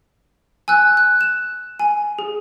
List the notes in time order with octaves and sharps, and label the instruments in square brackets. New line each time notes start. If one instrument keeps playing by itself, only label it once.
[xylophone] G#5 E6 F#6
F#6
E7
G#5
G#4